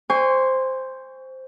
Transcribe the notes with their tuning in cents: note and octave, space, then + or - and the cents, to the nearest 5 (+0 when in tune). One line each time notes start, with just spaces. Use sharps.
C5 +0 G#5 -35 C#6 +20